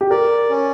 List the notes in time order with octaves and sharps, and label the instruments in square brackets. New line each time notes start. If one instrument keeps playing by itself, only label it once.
[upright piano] G4
[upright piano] A#4 [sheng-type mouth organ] D5
[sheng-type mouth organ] C#4